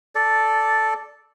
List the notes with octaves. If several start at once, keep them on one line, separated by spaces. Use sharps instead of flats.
A4 D5